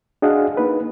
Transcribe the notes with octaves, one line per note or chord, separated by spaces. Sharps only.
D4 F#4 G#4 D#5 F5 F#5
A#3 D#4 B4